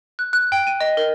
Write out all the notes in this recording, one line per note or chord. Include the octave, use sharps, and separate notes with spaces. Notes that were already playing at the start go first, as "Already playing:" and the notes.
F#6
F#6
G5
D#7
D#5
A#4